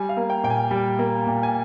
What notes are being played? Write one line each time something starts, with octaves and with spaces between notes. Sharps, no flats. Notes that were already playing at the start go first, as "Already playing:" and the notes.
Already playing: G3 G#5
F5
A#3
G5
A#2 G5
G#5
G3
A#3
A#2
G#5